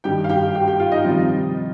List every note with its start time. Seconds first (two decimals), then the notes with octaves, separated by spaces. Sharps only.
0.04 G2 D#3 G3 G4 G5
0.24 F5
0.29 G4 G5
0.55 G4 G5
0.67 G4 G5
0.80 F4 F5
0.92 D#4 D#5
1.05 C3 D#3 F3 G3 F4